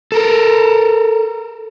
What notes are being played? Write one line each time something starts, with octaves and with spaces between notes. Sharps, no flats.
A4 A#4